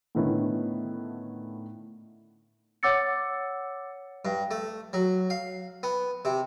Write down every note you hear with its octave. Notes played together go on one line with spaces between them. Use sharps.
A2 D3 D#3 B3 C#4 E4
C#5 F#5 D6 E6 A6 C#7
G2
A3
F#3
F5
B3
C3